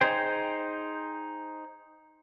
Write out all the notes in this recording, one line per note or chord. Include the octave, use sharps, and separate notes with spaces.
D#4 G#4 C5 G5